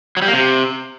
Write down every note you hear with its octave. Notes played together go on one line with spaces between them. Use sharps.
F#3
G3
A#3
C3